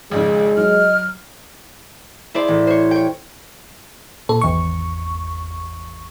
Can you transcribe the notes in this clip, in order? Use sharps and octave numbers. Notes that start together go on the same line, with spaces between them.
G#1 F2 C#3 G#3
F#3 D#5 F6
E4 G#4 C5 D5
A1
C5 C#5
C#5 G5
A#2 A4
G#1 E2 C#6